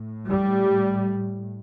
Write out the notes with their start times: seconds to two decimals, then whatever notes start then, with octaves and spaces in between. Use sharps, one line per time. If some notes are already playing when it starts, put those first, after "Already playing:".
Already playing: A2
0.28 G3